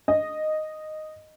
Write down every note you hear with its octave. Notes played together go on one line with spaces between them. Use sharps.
D#5